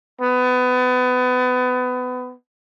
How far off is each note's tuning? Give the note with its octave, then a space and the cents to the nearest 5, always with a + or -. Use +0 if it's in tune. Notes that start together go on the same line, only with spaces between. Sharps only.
B3 +25